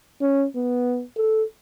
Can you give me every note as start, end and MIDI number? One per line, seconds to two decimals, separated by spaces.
0.21 0.45 61
0.56 1.04 59
1.17 1.43 69